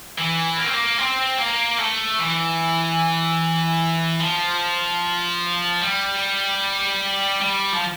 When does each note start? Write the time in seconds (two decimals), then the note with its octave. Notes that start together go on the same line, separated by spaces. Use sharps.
0.18 E3
0.58 A#3
0.67 C4
0.74 A#3
0.99 C4
1.38 A#3
1.78 A3
2.19 E3
4.20 F3
5.81 G3
7.41 G3
7.73 F3